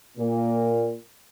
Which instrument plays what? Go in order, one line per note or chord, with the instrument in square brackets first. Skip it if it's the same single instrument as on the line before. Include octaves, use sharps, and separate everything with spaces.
[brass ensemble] A#2